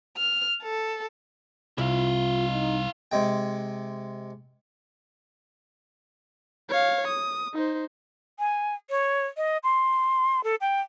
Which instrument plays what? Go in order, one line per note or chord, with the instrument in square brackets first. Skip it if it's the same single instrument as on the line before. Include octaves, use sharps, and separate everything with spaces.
[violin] F6
A4
[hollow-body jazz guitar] C2 [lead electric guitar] E4 F5 [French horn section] F4
[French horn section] D#4
[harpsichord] C3 G#3 G5
[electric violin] C#5 F5
D#6
D#4 C5
[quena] G#5
C#5
D#5
C6
A4
G5